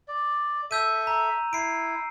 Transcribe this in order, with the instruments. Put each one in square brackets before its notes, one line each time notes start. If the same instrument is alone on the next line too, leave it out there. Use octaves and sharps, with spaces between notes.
[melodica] D5
[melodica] A4 E5 [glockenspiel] E6 G6 D#7
[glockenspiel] A#5
[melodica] E4 [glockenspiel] C7 D7